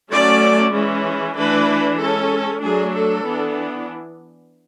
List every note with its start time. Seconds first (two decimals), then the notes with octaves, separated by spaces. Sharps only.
0.12 F#3 A3 C#4 D5
0.74 E3 G#3 C#4
1.36 E3 A3 D4 B4
1.99 G#3 C#4 A4
2.63 F#3 A3 D4 G#4
2.94 A4
3.25 E3 B3 D4